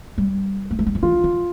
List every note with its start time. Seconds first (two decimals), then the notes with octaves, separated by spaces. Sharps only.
0.18 G3
0.71 A#3
0.79 A3
0.86 G3
0.95 F3
1.02 E3 F4
1.24 D3